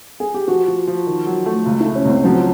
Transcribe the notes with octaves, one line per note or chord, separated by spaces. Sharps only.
G#4
G4
F3 F#4
F3
F3
D#3
F#3
A3
C#2 F4
E4
A3
C#4
C#2 C4
F3 F#3